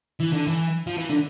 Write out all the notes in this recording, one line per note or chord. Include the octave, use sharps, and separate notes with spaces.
E3
D3
E3
F3
E3
D3